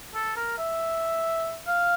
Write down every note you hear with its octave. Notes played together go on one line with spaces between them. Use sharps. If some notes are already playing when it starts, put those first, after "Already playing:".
A4
A#4
E5
F5